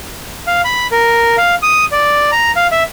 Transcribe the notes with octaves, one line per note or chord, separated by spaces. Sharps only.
F5
B5
A#4
F5
D#6
D5
A#5
F5
E5